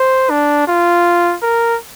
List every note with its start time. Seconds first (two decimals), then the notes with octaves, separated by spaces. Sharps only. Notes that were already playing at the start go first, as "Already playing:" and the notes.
Already playing: C5
0.30 D4
0.68 F4
1.43 A#4